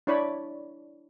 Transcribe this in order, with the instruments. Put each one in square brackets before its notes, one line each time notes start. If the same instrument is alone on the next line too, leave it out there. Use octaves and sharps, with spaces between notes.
[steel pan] D4 E4 C#5 D5 B5